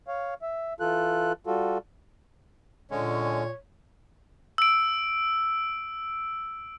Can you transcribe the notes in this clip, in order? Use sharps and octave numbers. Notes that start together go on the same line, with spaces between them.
C#5 F5
E5
E3 F4 A4 F#6
G3 F4 F#4 A4
A#2 D3 G#3 C#4 C#5
E6 D7